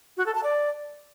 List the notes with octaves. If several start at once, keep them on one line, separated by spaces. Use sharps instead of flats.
F#4
A4
A5
D5